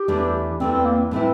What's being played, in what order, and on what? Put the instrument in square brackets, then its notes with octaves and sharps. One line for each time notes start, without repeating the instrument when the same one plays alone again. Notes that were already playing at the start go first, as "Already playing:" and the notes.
Already playing: [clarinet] G4
[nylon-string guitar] E2 E3 A3 D4
[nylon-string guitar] E2 E3 A3 D4 [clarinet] C4
[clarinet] C4
A#3
[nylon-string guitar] A2 E3 A3 E4 [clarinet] C4